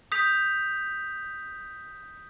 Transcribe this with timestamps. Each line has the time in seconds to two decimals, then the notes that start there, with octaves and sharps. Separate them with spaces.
0.12 D#6 G6 B6 F7